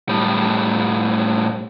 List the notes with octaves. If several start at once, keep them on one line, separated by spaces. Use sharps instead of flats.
A2 G3